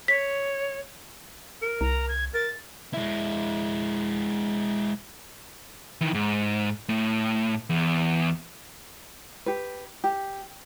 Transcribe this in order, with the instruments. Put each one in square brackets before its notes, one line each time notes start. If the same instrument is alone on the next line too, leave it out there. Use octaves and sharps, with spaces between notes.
[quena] C#5 [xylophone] B6
[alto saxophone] A#4
[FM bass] C2 [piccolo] A#5
[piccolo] G#6
[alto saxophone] A#4 [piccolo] A6
[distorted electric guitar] G#3 E4
[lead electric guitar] D#3 E3
G#2
A2
E2
[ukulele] G4 B4
G4